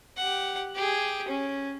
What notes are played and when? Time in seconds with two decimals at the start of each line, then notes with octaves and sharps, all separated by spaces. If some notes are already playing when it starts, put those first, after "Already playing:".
0.17 G4 F#5
0.75 G4 G#4
1.28 C#4